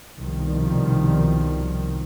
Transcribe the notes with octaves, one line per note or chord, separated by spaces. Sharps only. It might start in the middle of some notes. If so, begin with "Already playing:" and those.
C2 B2 D#3 F3 G3